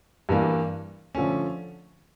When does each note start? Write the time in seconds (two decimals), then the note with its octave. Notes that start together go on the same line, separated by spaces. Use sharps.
0.29 G2 E3 G3 A#3
1.15 D3 F3 A3 C#4